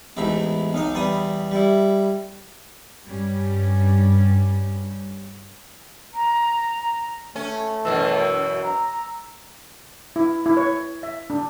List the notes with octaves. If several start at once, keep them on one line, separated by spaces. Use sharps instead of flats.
A1 E2 G#2 E5 B5
B1 D#4 D#5
E2 G3 B5 D#6
G3 E4
G2 G3 C#4
A#5
A3 C#4
F#2 B2 E3 E6
A#5
E4
E4
C#5
E5
D4